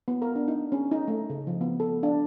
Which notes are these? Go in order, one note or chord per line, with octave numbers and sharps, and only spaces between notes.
B3
A#4
D4
D#4
C#4
D#4
A3
C#3
F3
B3
A4
D4